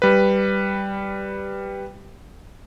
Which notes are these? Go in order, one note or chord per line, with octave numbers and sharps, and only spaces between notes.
G3 B4